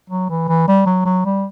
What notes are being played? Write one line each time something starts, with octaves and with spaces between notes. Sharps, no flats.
F#3
E3
E3
G3
F#3
F#3
G3